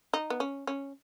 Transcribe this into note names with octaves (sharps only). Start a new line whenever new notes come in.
D#4
B3
C#4
C#4